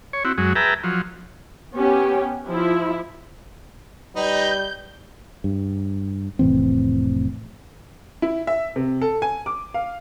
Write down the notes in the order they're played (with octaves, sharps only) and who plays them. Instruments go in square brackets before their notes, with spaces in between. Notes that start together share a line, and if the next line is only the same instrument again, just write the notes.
[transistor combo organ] C#5
C4 E4 F#4
F#2 F#3 G#3
G#4 B4 E5 G5 A5 A#5
F3 F#3
[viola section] B3 C#4 G4
F3 E4
[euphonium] G3 [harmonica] D#4 B4 D#5 [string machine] G6
[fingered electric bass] G2
F1 A2 E3 C4
[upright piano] E4
E5
C3
A4
G#5
D6
F5